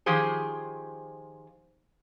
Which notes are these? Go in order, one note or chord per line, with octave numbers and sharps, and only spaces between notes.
D#3 F3 G4 G#4 C5